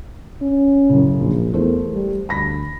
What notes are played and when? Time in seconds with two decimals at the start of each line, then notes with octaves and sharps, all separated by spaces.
0.42 C#4
0.90 F#2 A2 C#3
1.20 A#1
1.54 E2 A3 A#4 C5
1.94 G3
2.29 D2 B5 A#6 B6